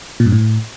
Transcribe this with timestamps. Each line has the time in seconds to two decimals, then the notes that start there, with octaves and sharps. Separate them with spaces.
0.20 A#2
0.26 G2
0.32 A2